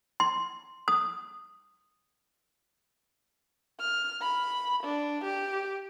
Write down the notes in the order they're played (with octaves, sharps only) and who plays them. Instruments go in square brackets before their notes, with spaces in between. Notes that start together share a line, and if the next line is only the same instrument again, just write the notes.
[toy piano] C6
D#6
[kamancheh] F6
B5
D4
G4